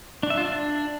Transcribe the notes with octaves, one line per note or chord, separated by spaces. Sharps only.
D4
E5
F4
D4